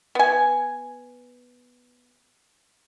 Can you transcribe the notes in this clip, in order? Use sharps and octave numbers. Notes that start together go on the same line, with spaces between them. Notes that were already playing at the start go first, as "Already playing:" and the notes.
B3 G#5